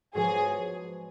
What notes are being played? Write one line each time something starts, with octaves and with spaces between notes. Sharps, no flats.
G#2 F3 B3 F#4 G#4 C#5